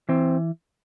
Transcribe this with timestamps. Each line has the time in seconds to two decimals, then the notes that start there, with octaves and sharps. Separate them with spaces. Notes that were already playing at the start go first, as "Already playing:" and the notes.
0.09 E3 C4